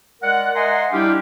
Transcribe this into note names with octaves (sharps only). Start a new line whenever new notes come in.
G#3 A#4 D5 F#5
D#5 E5 F#5 G#5 A#5 C6
G3 D4 E4 F4 G4